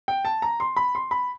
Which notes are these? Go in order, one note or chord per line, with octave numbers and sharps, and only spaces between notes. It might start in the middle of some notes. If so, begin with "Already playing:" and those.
G5
A5
A#5
C6
B5
C6
B5